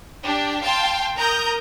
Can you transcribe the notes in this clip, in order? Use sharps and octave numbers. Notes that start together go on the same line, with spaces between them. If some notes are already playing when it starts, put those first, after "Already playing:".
D4 G4
F5 G5 A5 C6
A#4 A#5 D#6 G6